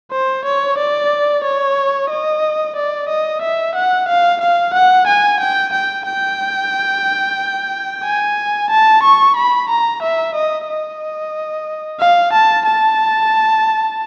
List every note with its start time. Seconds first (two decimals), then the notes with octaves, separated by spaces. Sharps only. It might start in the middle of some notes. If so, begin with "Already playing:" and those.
0.12 C5
0.45 C#5
0.78 D5
1.44 C#5
2.10 D#5
2.76 D5
3.09 D#5
3.42 E5
3.75 F#5
4.08 F5
4.41 F5
4.74 F#5
5.07 G#5
5.40 G5
5.73 G5
6.06 G5
8.04 G#5
8.70 A5
9.03 C#6
9.36 B5
9.69 A#5
10.02 E5
10.35 D#5
10.68 D#5
12.00 F5
12.33 A5
12.66 A5